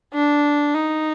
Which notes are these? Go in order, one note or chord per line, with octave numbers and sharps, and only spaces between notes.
D4
D#4